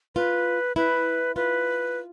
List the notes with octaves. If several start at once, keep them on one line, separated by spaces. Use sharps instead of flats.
F4 B4
E4 B4
F4 B4